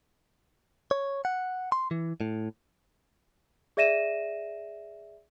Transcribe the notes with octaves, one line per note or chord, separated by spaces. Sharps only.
C#5
F#5
C6
E3
A2
G#4 D5 E5 A#6 D#7 E7